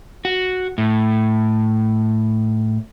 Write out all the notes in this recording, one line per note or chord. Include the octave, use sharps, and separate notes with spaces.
F#4
A2